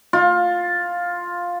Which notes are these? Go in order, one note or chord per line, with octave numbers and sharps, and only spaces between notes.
F4